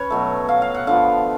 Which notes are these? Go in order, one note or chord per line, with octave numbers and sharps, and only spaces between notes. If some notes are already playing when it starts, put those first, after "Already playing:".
Already playing: C#4 B4 C#5
B2 F#3 A3
F5
F5
F#5
D3 F3 B3 F5